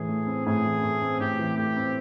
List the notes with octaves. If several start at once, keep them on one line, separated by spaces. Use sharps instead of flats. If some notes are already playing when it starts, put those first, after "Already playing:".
Already playing: A2 E3 G#4
A3
C4
A2 G#4
E3
A3
C4
A2 G4
E3
A3 G4
C4